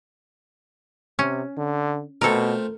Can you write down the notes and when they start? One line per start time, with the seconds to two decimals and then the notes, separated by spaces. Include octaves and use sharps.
1.19 C3 C#4
1.57 D3
2.21 B2 A3 C4 F4 A4 A#4